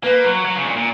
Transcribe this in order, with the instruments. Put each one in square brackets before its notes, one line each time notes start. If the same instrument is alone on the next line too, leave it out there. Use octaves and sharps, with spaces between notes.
[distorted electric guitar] A#3 [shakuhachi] B4
[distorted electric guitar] F#3
F#3
C#3
G#2
A#2
A#2